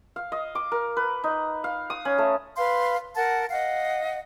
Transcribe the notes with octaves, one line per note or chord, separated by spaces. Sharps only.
F5
D#5
D6
A#4
B4
D#4
F5
D#6
C#4
A3
B4 F5 C6
A#4 F#5 A5
D#5 F5 F#5